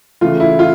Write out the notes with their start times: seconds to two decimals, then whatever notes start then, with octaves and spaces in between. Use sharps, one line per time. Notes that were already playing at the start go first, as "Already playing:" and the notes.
0.21 C#3 E3 A3 F4
0.40 E4
0.59 F4